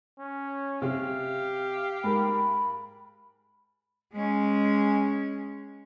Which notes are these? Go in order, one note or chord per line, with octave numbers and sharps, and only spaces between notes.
C#4
C3 G4 F5
G#2 A#4 B5
G#3 C#4